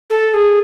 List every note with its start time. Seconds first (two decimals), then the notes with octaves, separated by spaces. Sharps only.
0.10 A4
0.34 G#4